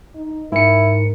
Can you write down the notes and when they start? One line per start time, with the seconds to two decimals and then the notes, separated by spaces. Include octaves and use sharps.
0.15 D#4
0.52 G#2 E4 A#4 C#7